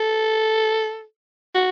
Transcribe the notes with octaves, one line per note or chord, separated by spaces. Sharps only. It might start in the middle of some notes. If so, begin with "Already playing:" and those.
Already playing: A4
F#4